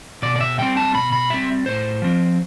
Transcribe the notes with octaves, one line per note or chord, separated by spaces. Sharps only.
B2 D5
D5
E5
G3 C4 G5
A5
B2 B5
B5
G3 C4 E5
A2 C5
F3 C4